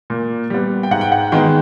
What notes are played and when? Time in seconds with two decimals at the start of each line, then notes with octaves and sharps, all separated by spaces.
0.10 A#2
0.50 G3 B3
0.83 G5
0.91 G#2 F#5
1.01 G5
1.12 F#5
1.32 D#3 G#3 B3 G5